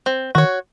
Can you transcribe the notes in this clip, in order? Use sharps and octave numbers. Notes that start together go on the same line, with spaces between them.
C4
D#3 F#4 C#5